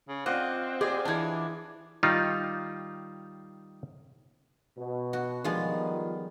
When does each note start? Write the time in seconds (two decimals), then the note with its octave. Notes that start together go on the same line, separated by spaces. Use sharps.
0.08 C#3
0.26 C4 F4 D5 D#5 F#5
0.81 G4 G#4 D5 D#5 D6
1.05 E3 D4 A5 G#6
2.03 D#3 G3 D#4 F4
4.77 B2
5.13 F#4
5.44 D#3 F3 G3 G#3 B3 F4